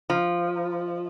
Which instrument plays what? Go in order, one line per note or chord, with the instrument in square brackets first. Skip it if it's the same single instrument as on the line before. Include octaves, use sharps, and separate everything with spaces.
[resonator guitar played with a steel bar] F3